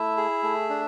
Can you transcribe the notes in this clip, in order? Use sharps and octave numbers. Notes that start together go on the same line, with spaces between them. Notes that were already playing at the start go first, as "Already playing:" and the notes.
Already playing: A3 E4 E5
G#4
A3
D4